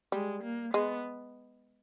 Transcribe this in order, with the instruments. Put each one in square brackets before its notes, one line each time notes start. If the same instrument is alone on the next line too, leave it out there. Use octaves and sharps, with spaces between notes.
[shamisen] G3 [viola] G#3
[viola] A#3
[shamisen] G#3 [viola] B3